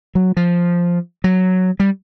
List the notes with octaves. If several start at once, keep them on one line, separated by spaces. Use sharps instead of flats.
F#3
F3
F#3
G3